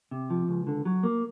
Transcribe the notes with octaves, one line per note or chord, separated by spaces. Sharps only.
C3
F3
C#2
D3
F#3
A#3